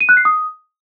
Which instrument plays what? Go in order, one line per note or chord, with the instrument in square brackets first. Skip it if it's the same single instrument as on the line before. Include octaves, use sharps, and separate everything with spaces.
[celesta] D#7
F#6
C7
D#6